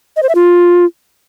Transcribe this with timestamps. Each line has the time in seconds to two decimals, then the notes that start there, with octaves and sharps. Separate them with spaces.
0.16 D#5
0.23 C5
0.29 E5
0.35 F4